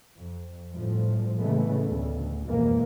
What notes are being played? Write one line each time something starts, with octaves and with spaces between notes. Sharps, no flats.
F2
G1 A2 F3
A2 C#3 E3 G#3 A3 B3
D2
F#1 F2 B2 E3 G#3 A#3